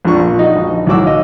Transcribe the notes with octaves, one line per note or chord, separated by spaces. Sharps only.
A#1 F2 D4 F4 C#6
A#2
D#4 F#4 D#5
A#1
B1 A2 F#4 D6 E6
D#5 F5